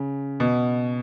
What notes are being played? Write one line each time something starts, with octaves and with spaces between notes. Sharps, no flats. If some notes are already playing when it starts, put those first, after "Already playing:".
Already playing: C#3
B2